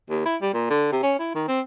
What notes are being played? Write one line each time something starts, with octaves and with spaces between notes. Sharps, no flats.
D#2
E4
G3
A#2
D3
C3
C#4
E4
D#3
C4